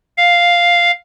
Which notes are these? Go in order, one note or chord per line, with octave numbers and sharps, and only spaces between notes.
F5